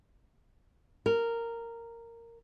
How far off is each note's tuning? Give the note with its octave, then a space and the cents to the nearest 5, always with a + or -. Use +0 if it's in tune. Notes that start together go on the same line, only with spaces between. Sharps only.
A#4 -10